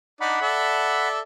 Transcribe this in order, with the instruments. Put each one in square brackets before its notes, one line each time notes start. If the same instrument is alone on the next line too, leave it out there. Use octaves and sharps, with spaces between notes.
[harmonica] D4 D#4 D5 [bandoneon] F#5 B5
[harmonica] A4 D5 E5